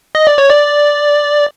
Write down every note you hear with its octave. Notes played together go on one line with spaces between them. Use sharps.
D#5
D5
C#5
D5